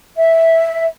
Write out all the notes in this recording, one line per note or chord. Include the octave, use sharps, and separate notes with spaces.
E5